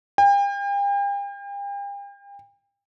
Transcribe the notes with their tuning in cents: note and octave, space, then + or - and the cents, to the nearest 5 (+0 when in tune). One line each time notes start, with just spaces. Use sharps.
G5 +40